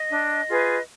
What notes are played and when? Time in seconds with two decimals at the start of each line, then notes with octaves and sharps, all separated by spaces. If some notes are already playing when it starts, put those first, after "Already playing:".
Already playing: D#5
0.10 D4
0.48 F4 G#4 B4